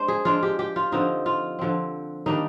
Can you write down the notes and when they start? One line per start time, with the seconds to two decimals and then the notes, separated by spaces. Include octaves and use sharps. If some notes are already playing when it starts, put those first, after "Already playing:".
Already playing: G#3 D4 C5
0.08 G#4
0.25 F3 G#3 D4 F4
0.43 G4
0.59 G4
0.76 F4
0.92 D3 F3 C4 D#4
1.26 F4
1.59 D3 F3 C4
2.26 D#3 G3 A#3 D4 D#4